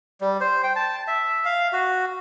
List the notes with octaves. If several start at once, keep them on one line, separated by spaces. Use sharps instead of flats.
G3
C5
G5
A5
E5
F5
F#4